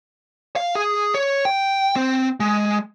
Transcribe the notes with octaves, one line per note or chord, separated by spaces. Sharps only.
F5
G#4
C#5
G5
C4
G#3